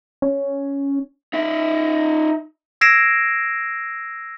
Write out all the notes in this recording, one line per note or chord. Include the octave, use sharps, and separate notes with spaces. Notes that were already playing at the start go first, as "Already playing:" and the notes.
C#4
D#4 E5
E6 G#6 A#6 C7 D7 E7